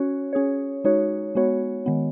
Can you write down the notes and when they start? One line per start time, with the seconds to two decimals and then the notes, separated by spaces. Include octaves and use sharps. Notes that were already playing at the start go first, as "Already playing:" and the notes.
Already playing: C#4 F#4 C#5
0.33 C#4 G#4 C#5
0.84 G#3 D#4 F#4 C#5
1.35 G#3 B3 F#4 C#5
1.86 D#3 G#3 B3